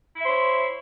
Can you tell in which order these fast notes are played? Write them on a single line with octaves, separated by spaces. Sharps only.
E4 E5 C5 C#5